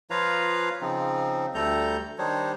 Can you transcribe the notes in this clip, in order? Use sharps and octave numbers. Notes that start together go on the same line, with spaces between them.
F3 F4 B4 C#5 F5 A#5
C#3 F3 C4 D#4
D2 G3 A3 A4 A#5 G6
D#3 G3 D4 D#4 C5 C#5